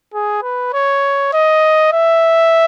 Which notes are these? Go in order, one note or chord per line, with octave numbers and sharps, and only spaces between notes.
G#4
B4
C#5
D#5
E5